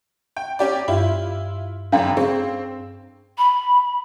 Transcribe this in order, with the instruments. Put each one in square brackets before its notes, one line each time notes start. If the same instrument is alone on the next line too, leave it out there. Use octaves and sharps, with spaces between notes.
[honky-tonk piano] G5
C#4 G4 D5
[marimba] G2 [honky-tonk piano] E4 F4
[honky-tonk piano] G#1 F#2 C#3 [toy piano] D4 F5 G5
[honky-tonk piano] C4 [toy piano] G#4
[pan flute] B5